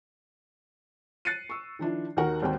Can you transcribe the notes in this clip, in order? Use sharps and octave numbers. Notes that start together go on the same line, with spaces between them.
F#6 A6 C7 C#7 D#7
C#6 E6
D#3 F3 D4 E4
D#2 D#3 F#4 A#4 F#5
G#1 D#2 C4 F#4 G5